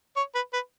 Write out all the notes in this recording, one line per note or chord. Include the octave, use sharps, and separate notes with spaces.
C#5
B4
B4